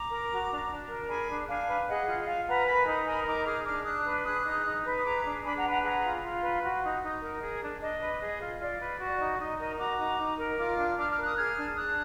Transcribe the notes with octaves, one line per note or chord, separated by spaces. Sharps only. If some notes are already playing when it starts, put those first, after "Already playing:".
Already playing: A#5 D6
A#4
F#4
D4
D4
A#4
G#4 G#5 B5
D4
D4 F5 G#5
B4
G#4 D#5 F#5
F4
F4 F5 G#5
B4 F#5 A#5
A#4 G#5 B5
D#4
A#4 G#5 B5
D#4 A#5 D6
G#4 D6 F6
D4 D6 F6
D4 D#6 F#6
B4
G#4 D#6 F#6
D#4
D#4
B4
D#6
G#4 A#5 D6
D4
D4 G#5 B5
F#5 A#5
B4
F#5 A#5
G#4 F#5 A#5
F4
F4
B4
F#4
D#4
D#4
A#4
G#4
D4
D4 D#5
B4
G#4
F4
F4 D5
B4
F#4
D#4
D#4 D#5
A#4 D#5
F#4 A#5 D6
D#4
D#4
A#4
F4 D6 F6
D4
D4 D6 F6
D6 F6
A#4
D#6 F#6
G#4 F6 G#6
D4
D4 D#6 F#6